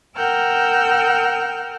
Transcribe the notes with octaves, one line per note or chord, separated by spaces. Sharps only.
A#4 F#5 G5 E6 F6 G6